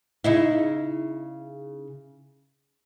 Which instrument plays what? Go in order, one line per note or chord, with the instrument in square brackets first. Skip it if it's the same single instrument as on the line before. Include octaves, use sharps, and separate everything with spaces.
[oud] C#3 D#4 E4